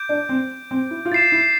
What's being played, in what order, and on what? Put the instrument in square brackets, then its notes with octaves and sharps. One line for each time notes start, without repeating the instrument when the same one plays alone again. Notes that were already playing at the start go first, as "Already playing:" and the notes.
Already playing: [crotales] D6 G6 D7
[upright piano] D4
C4
C4
E4
F4
[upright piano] E4 [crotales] A6 C7 E7
[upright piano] E4